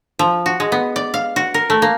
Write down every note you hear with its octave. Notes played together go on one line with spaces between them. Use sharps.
F3
F#4
G#3
B3
D5
F5
F#4
A#4
A3
A#3